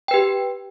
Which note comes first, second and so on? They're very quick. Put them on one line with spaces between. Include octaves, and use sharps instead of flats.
G5 B4 G4